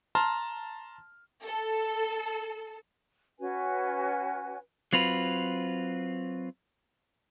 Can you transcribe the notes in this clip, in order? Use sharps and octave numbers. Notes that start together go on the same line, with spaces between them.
A5 A#5 C6 F6
A4
C#4 F#4 B4 G#5
F#3 C4 F4 B4